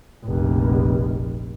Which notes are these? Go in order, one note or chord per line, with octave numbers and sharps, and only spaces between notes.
F1 A#1